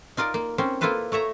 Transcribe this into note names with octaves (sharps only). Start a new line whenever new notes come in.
D#4 F4 A#4 D5
A#3
A#3 C4 C#4 C5
A#3 E4 F4 A4 B4 C5
A3 C#5 E5 A#5